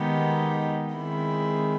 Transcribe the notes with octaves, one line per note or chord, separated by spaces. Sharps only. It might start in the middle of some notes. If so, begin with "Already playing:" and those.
Already playing: D#3 G#3 B3 D#4 G4
D#3 G#3 C4 E4